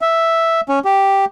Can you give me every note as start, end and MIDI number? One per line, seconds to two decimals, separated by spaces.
0.01 0.61 76
0.69 0.79 61
0.85 1.25 67